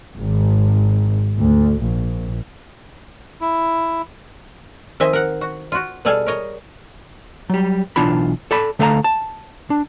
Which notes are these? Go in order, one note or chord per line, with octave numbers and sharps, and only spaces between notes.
G#1
D2
A#1
E4
D#3 F3 C4 D#5 E5 G#5
A#4 F#5
F#4
F4 F#4
B2 G3 G#4 A4 F5 G#5
A#4 C#5 D#5
F#3 G3
B1 E3 D4 F4 B5
A4 D5 A5 B5
D3 A3 A4 F5 A5 A#5
A5
D4